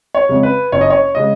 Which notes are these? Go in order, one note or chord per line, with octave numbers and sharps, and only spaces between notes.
C#5
F2 C#3 G#3
B4
F#1 C#5
D#5
C#5
C#3 G#3 D#5